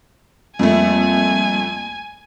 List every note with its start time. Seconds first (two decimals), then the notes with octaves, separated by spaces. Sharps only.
0.59 F2 G3 A3 A#3 C4 G#5